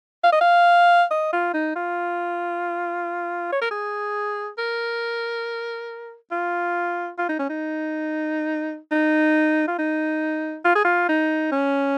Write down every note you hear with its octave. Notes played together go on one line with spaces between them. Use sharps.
F5
D#5
F5
D#5
F4
D#4
F4
C#5
A#4
G#4
A#4
F4
F4
D#4
C#4
D#4
D#4
F4
D#4
F4
G#4
F4
D#4
C#4